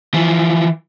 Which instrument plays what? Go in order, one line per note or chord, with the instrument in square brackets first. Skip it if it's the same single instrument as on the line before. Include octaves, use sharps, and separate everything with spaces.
[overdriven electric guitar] E3 F3